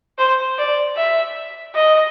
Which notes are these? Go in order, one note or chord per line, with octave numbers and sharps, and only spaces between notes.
C5
D5
E5
D#5